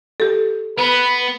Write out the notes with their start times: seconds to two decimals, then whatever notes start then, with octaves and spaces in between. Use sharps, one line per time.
0.20 G4 A4
0.79 B3 B4 B5